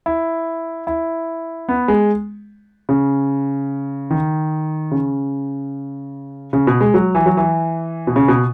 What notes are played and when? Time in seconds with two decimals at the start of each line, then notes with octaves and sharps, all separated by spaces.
0.06 E4
0.87 E4
1.69 B3
1.88 G#3
2.89 C#3
4.11 D#3
4.91 C#3
6.53 C#3
6.67 B2
6.81 G#3
6.94 F#3
7.15 E3
7.26 F#3
7.37 E3
8.07 B2
8.16 C#3
8.28 B2